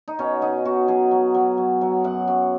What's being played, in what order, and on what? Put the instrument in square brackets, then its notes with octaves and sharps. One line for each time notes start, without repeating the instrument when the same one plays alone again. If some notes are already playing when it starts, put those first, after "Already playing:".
[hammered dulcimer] D#4
B2 C#4
B2 D#4
B2 F#4
F#3 G#4
F#3
F#3
F#3
F#3
F#2 F#5
F#2